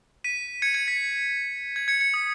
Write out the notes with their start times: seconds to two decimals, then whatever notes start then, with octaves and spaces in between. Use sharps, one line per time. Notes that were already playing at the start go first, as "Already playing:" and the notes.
0.24 B6 D#7
0.62 G#6 C#7
0.74 G#6 C#7
0.88 B6
1.76 G#6
1.88 G#6 C#7
2.01 G#6 C#7
2.14 D#6